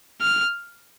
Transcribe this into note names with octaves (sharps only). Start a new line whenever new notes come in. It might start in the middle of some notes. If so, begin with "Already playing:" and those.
F6